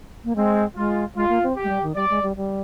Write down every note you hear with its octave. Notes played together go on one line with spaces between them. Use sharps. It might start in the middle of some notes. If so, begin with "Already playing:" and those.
A#3
G#3 C4
G#3 F4
G#3 F4
A#3
C4
G4
G#3
G3
D#3
G3 D5
G#3
G3
G3